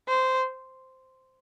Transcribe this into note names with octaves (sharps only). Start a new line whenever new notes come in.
C5